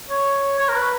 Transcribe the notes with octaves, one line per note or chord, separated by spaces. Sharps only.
C#5
C#5
A#4
B4